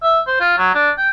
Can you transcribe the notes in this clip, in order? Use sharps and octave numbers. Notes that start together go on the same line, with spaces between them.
E5
C5
F4
F#3
D4
G5